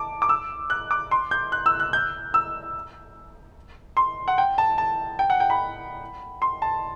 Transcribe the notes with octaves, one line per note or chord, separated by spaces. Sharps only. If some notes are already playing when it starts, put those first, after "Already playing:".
Already playing: A5 D6
D6
E6
F#6
D6
C6
G6
F#6
E6
F#6
G6
E6
C6
F#5
G5
A5
A5
G5
F#5
G5
B5
C6
A5